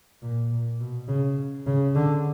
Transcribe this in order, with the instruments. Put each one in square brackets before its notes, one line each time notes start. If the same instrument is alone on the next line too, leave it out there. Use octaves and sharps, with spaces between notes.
[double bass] A#2
A#2
B2
C#3
C#3
D3